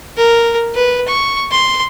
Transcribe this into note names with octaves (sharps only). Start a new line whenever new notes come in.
A#4
B4
C#6
C6